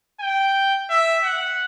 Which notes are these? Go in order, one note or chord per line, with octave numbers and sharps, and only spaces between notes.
G5
E5
F#5